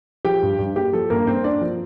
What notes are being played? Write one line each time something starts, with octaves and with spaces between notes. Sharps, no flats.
F3 G4 G5
G2
G2
A#3 G4
F3 A4
G2 A#3 A#4
G2 C4 C5
A#3 D4 D5
F3